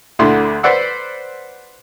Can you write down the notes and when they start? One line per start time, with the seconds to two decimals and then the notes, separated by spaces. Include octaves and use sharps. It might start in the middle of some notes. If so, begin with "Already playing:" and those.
0.19 D2 D3 E4 C6
0.63 B4 C5 D5 F#5 E6